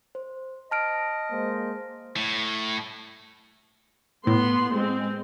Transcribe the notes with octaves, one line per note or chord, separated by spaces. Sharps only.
C5
D#5 A5 F6 D7
G#3 A#3 C5
A2
A2 B3 C6
G#3 C4